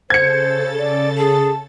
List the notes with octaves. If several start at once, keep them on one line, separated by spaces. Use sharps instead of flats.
C#3 A4 C5 G#6 A6 C#7
D5
G#4 A5